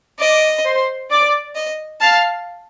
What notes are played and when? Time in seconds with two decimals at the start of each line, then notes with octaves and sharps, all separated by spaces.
0.20 D5 D#5 D6
0.65 C5 C6
1.10 D5 D6
1.55 D#5
2.01 F5 A5 F6